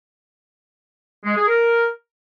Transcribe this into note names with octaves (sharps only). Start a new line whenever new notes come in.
G#3
G#4
A#4